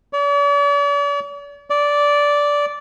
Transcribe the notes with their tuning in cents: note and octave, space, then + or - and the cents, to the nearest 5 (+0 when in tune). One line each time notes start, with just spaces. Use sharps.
D5 -45
D5 -10